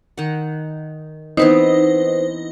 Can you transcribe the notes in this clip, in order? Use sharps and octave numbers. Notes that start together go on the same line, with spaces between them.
D#3 F#5
E3 B3 C4 D#4 B4 C5